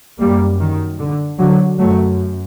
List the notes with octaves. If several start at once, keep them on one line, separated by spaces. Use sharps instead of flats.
F#2 G3 A#3
D#3
D3
D3 F#3
F#2 F#3 A3